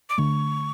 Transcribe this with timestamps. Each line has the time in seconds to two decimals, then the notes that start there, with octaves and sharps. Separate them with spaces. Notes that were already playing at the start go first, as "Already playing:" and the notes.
0.09 D6
0.18 D3 A3 C#6